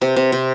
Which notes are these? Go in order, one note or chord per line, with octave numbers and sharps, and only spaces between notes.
C3
C3
C3